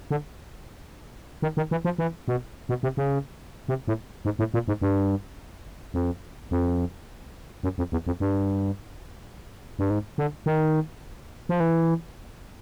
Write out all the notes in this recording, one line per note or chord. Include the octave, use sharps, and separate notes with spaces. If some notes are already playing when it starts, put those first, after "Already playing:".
D3
D#3
D#3
E3
F3
E3
B2
B2
C3
C#3
C3
A2
G#2
A2
A#2
G#2
G2
F2
F2
F#2
F2
E2
F2
G2
G2
G#2
D3
D#3
F3
E3